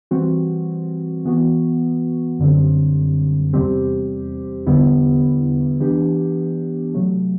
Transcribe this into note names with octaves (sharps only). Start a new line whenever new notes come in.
E3 G3 C4 F#4
E3 B3 F#4
F#2 D3 G3 C4
E2 C3 G3 C4 G4
E2 D3 G3 B3 E4
E3 B3 D4 G4
C3 F#3 A3